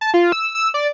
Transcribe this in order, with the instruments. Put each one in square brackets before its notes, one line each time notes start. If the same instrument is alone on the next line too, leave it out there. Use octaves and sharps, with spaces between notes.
[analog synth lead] A5
F4
E6
E6
D5